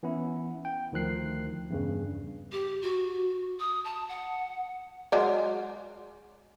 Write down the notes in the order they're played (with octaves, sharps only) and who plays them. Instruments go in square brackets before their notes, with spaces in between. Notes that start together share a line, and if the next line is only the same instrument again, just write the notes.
[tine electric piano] E3 B3 C#4 E4
G5
D2 D#3 F3 F#6 C7
E2 G2 C#3
[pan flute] G4
F#4
D#6
A5
F#5
[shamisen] F#3 G#3 D5